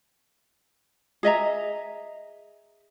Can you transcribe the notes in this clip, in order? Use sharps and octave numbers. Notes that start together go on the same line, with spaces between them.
G#4 D#5 E5 A#5